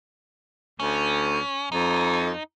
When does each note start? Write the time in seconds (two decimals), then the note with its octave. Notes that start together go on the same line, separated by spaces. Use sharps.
0.80 D2 C#4
1.72 F2 D#4